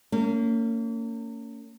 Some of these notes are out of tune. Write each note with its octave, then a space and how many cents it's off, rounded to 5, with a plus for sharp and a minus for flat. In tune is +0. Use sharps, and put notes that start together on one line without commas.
A#3 -35 C#4 +25